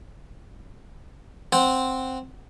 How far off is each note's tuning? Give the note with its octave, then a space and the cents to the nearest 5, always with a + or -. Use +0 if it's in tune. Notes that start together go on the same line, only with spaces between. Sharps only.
C4 +0 C5 +0 F#5 +0